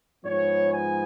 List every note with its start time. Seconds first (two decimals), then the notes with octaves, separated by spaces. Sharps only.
0.24 G#2 F3 G#3 B3 C#5
0.71 G#5